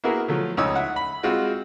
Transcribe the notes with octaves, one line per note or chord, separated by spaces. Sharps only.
A#3 B3 E4 F#4 G#4 A#4
F3 F#3 A3
C#2 D#4 C#5 D#6 E6
E5 F#5
B5
G#3 C4 F4 F#4